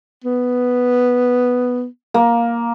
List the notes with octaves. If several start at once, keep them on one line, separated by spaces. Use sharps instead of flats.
B3
A#3